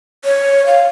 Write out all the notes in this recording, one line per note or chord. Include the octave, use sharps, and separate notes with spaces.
C#5
F5